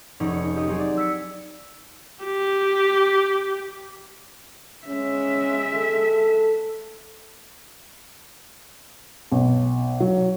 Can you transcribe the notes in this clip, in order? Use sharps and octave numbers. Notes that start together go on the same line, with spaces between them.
F1 C#4 D#4 G#4 D5
C#7
G4 D#5 C#6
F#3 C4 D#4 G4 G#4
D5
E6 B6 C#7
G4
G#3 C#4 E5
A4
B1
F#3